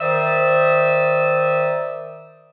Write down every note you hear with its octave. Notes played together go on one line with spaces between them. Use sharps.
D#3 C5 D5 E5 D#6 E6